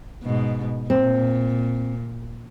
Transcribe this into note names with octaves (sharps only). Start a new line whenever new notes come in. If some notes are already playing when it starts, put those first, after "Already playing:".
G#2 B2
A#2 C4